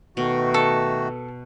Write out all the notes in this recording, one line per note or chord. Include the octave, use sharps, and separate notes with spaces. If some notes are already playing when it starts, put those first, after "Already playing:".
B2 D#3 A3 F#4
A4